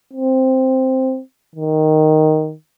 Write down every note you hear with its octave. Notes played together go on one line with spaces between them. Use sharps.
C4
D#3